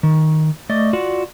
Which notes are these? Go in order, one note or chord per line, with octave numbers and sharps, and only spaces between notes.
D#3
A3 D5 D#5
F4 F#4 D5 F#5